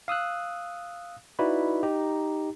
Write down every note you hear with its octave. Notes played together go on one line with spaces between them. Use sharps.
F5 D#6 E6 F#6
D#4 E4 F#4 B4 D5 B5
D#4 G4 A#5